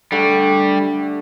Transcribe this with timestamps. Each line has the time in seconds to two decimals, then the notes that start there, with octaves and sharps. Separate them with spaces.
0.12 D3 G3 A3 D5